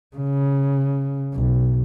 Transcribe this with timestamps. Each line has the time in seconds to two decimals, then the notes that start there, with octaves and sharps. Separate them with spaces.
0.16 C#3
1.34 B1